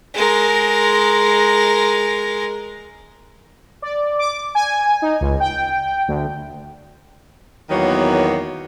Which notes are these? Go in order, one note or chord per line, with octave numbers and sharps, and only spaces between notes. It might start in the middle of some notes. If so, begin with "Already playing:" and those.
G#3 A#4
D5
D6
G#5
D#4
C#2
G5
D2
E2 D#3 F#3 A#3 B3 C#5